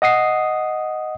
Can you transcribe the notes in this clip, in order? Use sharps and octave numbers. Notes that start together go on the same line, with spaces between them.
D#5 F#5 D#6 C7